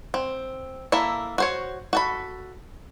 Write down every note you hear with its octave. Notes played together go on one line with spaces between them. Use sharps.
C4
A#3 E4 A4 E5
F#4 C5 C#5
F#4 A4 B5